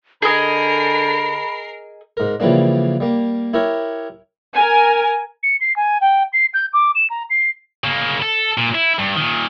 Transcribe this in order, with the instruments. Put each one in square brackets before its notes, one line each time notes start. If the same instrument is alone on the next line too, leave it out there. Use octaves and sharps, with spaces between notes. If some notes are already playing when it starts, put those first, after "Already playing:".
[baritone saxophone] D3 [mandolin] G#4 D#5 [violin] A#4 C7 [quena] B5
[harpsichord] G#2 A#4
C#3 E3 F3 G3 A#3 D4
G3 A#3
E4 G4 A#4 C#5
[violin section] A#4 G#5
[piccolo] C#7
C7
G#5
G5
C7
G6
D6
E7
A#5
C7
[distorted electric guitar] C#3 A#3
A4
A#2
E4
G2
A#2 D#3